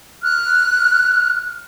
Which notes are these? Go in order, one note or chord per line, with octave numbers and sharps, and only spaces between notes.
F6 F#6